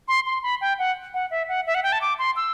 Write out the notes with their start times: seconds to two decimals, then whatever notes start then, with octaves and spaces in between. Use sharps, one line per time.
0.08 C6
0.26 C6
0.43 B5
0.61 G5
0.79 F#5
1.14 F#5
1.31 E5
1.48 F#5
1.66 E5
1.75 F#5
1.83 G5
1.92 A5
2.01 D6
2.19 C6
2.36 E6